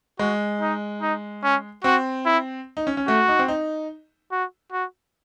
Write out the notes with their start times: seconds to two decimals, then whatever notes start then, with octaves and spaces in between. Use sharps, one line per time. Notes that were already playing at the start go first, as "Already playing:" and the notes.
0.19 G#3 F#4
0.61 D#4
1.01 D#4
1.44 C#4
1.84 C4 F#4
2.26 E4
2.77 D#4
2.87 C#4
2.97 C#4
3.08 A3 F#4
3.28 D#4
3.39 C4
3.48 D#4
4.32 F#4
4.72 F#4